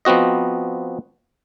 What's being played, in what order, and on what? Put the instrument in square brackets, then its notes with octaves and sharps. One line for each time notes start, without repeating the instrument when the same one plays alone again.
[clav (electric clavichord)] F3 B3 C4 F#4 D#5